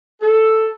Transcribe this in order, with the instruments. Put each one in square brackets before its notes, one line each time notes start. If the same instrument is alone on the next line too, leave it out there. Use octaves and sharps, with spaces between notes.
[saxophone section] A4